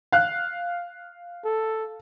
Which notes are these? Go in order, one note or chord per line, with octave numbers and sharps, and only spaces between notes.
F5 F#6
A4